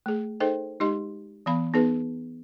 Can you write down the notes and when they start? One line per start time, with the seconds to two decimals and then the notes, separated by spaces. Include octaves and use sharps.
0.06 A3 G#4
0.40 D#4 G#4 A4 C5 D#5 G5
0.80 G#3 D#4 G4 D#5 C6
1.46 E3 B3 F5 B5
1.74 B3 D#4 G#4 B4